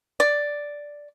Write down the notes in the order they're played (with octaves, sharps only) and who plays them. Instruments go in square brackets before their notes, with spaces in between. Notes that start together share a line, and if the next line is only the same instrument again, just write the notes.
[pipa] D5